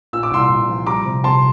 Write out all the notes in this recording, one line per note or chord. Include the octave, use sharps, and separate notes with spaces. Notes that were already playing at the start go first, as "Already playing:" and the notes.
A#2 E6
D6
C2 C6 E6
C2
F3
G3 A#5 D6
C3
C3 A5 C6